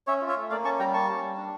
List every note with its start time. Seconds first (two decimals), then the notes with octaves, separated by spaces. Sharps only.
0.07 C#4 C#5 E5
0.21 F4
0.28 C#5 E5
0.36 A3
0.50 A#3 D5 F5
0.65 C#4 A5 C#6
0.79 G3 G5 A#5
0.94 A#3 A5 C#6
1.08 C#4
1.22 G3
1.37 D4